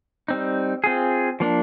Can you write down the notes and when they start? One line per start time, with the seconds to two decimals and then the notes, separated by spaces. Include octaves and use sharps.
0.28 G3 C4 D#4
0.84 C4 F4 G#4
1.40 F3 A#3 D4